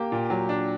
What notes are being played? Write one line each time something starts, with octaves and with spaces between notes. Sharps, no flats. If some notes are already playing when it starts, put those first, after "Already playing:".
Already playing: A#3 G4 G5
A#2
F#3
D4